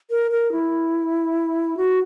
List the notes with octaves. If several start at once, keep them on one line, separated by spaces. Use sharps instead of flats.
A#4
A#4
E4
F#4